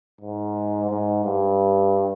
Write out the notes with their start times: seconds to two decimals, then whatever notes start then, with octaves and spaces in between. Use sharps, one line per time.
0.21 G#2
0.90 G#2
1.24 G2